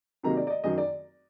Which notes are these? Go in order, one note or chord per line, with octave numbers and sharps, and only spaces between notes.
C3 D#3 F#3 A#3 A#5
D5
D5
D#5
F#2 D#3 F#3 D#5
D5